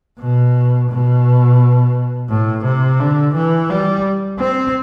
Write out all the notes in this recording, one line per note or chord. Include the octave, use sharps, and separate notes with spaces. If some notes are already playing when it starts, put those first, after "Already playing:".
B2
B2
A2
C3
D3
E3
G3
C4